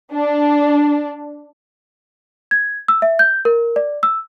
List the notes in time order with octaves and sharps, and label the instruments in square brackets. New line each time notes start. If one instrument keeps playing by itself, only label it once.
[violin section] D4
[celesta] G#6
E6
E5
G6
A#4
D5
E6